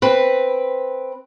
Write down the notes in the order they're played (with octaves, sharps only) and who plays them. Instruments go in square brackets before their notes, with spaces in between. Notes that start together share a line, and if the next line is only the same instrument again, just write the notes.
[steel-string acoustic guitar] C4 B4